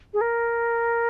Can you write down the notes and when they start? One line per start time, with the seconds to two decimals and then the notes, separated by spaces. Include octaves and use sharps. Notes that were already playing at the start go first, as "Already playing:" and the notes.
0.14 G#4
0.21 A#4